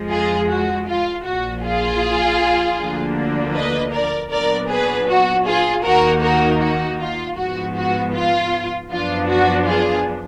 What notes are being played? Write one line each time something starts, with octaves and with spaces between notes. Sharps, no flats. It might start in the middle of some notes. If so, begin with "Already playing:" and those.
Already playing: F2 F3 G#3
F4 G#4
F#4
F4
A#1 A#2 F3 F#4
F4 G#4
D2 D3 F3 A#3 D4
B4 D#5
A#4 D5
A#2 F#3 B3 D4 A#4 D5
G#4 B4
F#4
F4 G#4
D#2 D#3 A#3 D#4 F#4 A#4
F#4 A#4
F#4
F4
G#2 F3 B3 F#4
F#4
F4
F#2 F3 B3 D4 F4
F#4
F4 G#4